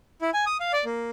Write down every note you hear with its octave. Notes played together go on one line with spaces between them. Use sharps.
E4
G#5
D#6
F5
D5
A#3